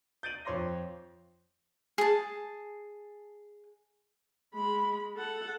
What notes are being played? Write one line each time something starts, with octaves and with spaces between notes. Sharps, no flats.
G6 A6 D7 D#7 F#7
F2 F3 C#5 C6 D6 A#6
G#4 A5
G#3 B5
A4 F#5